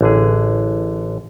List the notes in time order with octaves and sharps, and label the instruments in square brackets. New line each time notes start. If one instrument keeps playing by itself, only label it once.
[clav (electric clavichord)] A1 D3 G#4